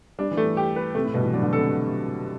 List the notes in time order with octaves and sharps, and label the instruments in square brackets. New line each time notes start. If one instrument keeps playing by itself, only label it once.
[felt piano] G3 [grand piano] D4
[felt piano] E3
[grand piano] A3
[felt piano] E3
[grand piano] G4
B4
[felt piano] C3 [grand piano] A3
[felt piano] A2
[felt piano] G2 [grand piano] B2
[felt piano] E3
[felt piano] F#3 [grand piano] D4
[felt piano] D3
[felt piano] C3 [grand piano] A4